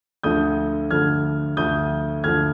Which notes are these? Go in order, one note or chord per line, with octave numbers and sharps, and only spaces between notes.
D2 D3 F3 D#6 G6
D2 D3 F3 F6 G#6
D2 D3 F3 D#6 G6
D2 D3 F3 F6 G#6